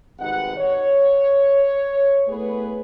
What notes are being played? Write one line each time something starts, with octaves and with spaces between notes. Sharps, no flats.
G#1 C3 G3 D#4 B4 F#5
C#5
A3 B3 E4 G#4 B4